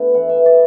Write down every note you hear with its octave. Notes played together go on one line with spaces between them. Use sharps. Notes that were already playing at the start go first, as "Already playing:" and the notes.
Already playing: A3 B3 D4
E3 F#5
E5
E3
D5